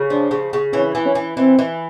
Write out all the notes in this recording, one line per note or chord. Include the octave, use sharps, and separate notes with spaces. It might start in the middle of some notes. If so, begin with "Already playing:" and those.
Already playing: C#3
F3 D4
C#3
C#3
E3 C#4
E3
C#4
E3
E3 C4
E3